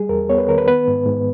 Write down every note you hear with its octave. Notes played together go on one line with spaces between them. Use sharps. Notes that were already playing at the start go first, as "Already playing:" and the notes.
Already playing: G3 G#4
E2 A#4
B3 C#5
B4
D#3 A#4
B4
B3 B4
G#2
G#2